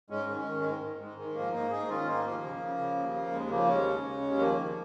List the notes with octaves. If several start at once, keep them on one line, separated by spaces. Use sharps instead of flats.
G#2 G#3 C#4
D#3
G#3 C#4
D#3
G#2 G#3
G#2
G#2 G#3
D#3 G#3
G#2 F3 A#3
G#2 A#3 D#4
G#2 D#4 G#4
D#3 C#4 F4
G#2 A#3 D#4
D#2 F3 A#3
C#3
C#3
C#3
D#2
C#3
D#2 G#3
C#3 F3 A#3
D#2 G#3 C#4
C#3
C#3
D#2
D#3 F3 A#3
D#3